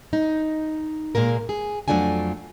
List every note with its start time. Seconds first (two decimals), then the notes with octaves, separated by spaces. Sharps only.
0.13 D#4
1.15 A#2 G#3 A#3 A#4
1.49 G#4
1.88 F2 F#3 A3 D4 F4 G#5